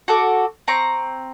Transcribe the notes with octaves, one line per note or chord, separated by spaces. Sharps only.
F#4 A4 D6
C4 A#5 C#6